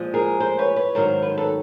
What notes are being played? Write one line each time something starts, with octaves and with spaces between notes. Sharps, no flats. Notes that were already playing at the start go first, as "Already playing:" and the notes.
Already playing: A#2 F3 G#3
G#4 A#4
A#4 C5
B4 C#5
B4 C#5
G#2 D#3 F#3 A#4 C5
B4
C5
A4 B4